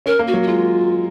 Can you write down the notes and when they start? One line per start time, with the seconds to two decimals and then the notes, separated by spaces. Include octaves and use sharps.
0.06 C#4 A#4
0.19 A#3
0.27 F#4
0.34 F#3
0.43 F#4
0.47 G#3 F4